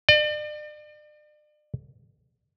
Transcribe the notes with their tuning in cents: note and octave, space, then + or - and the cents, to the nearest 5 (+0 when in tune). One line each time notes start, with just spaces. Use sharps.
D5 +40